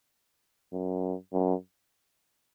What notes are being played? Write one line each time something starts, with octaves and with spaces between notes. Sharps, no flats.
F#2
F#2